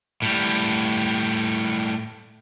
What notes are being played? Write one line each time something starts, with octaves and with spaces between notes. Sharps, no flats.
A2 G3